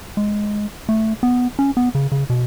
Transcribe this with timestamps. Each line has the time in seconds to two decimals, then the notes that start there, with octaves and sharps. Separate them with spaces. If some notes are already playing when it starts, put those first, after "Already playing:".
0.17 G#3
0.89 A3
1.23 B3
1.59 C#4
1.77 B3
1.95 C#3
2.12 C#3
2.30 B2